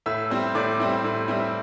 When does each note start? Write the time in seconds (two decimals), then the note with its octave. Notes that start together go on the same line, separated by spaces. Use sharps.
0.06 A2 E5 E6
0.30 G3 C4 E4
0.55 A2 D5 D6
0.80 G3 C4 E4
1.04 A2
1.28 G3 C4 E4